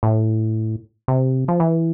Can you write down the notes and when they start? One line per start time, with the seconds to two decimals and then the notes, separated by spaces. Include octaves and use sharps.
0.03 A2
1.08 C3
1.48 F3
1.60 E3